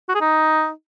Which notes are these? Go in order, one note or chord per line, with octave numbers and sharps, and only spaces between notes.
F#4
G#4
D#4